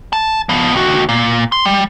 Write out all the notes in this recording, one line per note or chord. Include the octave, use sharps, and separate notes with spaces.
A5
F3 B3
D#2 F#4
A#2
C6
G3